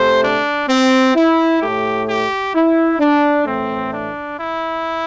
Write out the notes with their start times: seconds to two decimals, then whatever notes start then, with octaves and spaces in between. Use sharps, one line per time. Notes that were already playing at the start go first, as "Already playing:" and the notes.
Already playing: C3 A3 C5
0.22 D4
0.69 C4
1.15 E4
1.61 A2 A3 G4
2.07 G4
2.54 E4
2.99 D4
3.46 A2 E3 A3 C4
3.92 D4
4.38 E4